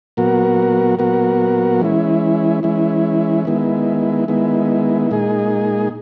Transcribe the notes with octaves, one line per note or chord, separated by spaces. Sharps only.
A#2 F#3 B3 F#4 A#4
A#2 F#3 B3 F#4 A#4
E3 G#3 C#4 E4
E3 G#3 C#4 E4
D#3 G#3 B3 E4
D#3 G#3 B3 E4
A#2 G#3 D#4 G#4